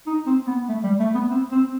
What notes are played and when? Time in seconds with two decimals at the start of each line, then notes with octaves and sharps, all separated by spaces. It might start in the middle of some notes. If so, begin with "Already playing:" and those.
0.07 D#4
0.27 C4
0.47 B3
0.69 A3
0.84 G3
1.00 A3
1.15 B3
1.31 C4
1.52 C4